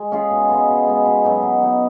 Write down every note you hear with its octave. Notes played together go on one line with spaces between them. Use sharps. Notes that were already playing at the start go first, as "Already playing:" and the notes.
Already playing: G#3
C#4 F4 G#4
B2
G#3 B3
B2
G#3 B3
B2
F#3 B3 D#4
B2
F#3 B3 D#4